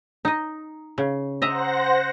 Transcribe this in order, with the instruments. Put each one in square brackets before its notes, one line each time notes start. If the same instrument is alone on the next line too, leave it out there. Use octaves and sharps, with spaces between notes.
[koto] D#4 D#5
C#3
[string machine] C5 F#5 A#6 [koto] D#5 E5 A#5